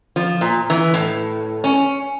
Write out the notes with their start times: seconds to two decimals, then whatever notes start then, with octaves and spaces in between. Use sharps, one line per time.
0.16 F3
0.41 A#2
0.70 E3
0.94 A2
1.64 C#4